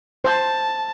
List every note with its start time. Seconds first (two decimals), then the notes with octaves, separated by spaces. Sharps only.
0.24 C5 A5